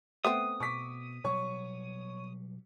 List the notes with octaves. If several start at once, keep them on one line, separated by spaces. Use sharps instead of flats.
A3 B3 C4 D#6
B2 C#6 D6 B6
B2 F#3 G3 C#5 C#6